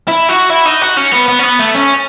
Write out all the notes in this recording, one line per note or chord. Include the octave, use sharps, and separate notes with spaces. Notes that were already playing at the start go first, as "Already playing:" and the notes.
E4
F#4
E4
D#4
F#4
C#4
B3
B3
C#4
B3
A3
C#4